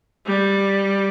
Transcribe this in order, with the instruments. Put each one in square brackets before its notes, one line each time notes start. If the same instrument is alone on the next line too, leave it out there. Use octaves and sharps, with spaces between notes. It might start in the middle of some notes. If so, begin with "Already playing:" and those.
[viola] G3